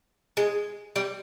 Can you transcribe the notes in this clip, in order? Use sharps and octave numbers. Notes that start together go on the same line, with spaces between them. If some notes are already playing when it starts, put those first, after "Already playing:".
G#3
G3